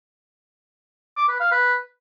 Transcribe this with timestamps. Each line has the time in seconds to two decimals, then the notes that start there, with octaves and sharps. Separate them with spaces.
1.17 D6
1.28 B4
1.40 F5
1.52 B4